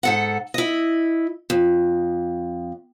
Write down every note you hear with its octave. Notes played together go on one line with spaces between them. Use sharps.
G#2 A4 F#5
E4 D#5
F2